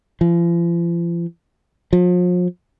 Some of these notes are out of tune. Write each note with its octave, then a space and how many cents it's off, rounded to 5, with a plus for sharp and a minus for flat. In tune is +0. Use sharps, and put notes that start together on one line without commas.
F3 -45
F3 +40